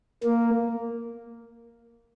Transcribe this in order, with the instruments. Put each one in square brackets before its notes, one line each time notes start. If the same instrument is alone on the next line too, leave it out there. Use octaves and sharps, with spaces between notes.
[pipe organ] A#3